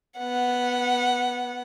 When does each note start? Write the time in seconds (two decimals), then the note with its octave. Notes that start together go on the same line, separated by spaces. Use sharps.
0.18 B3 F#5